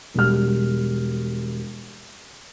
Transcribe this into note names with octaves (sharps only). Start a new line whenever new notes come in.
E1 G3 F6